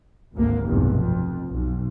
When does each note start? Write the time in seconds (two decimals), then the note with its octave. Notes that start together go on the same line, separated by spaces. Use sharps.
0.33 G#1 D2 A#3
0.65 F1 B1 E2 G2
0.95 F2
1.50 B1